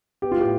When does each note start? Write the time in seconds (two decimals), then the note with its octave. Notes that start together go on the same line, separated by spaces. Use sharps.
0.22 B3 G4
0.32 F4
0.37 A2 G4